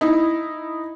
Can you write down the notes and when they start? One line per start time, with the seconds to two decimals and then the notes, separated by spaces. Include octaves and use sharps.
0.01 D#4 E4